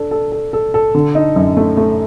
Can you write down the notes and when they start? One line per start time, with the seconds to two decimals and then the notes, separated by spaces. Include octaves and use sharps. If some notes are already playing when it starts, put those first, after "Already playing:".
Already playing: D4 A4
0.11 A4
0.32 A4
0.53 A4
0.74 A4
0.95 D3
1.15 D#4
1.36 F#2
1.57 A3
1.77 A3